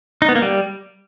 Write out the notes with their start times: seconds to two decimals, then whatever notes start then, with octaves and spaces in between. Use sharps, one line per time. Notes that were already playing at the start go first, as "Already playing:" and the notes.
0.22 D#4
0.29 B3
0.35 A#3
0.42 G3